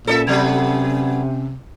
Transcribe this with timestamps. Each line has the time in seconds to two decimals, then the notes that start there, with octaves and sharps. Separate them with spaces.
0.07 A#2 C#4 A4 D5 E5
0.27 C3 F#3 A3 B3